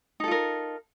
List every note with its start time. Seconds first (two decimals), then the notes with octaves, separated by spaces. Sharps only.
0.20 D#4
0.24 A4
0.28 F4
0.31 A#4